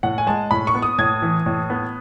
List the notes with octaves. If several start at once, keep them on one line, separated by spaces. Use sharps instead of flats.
A2 F#5
G#5
G#3 A5
A2 B5
C#6
B3
D#6
A2 G#6
E3
A2
B3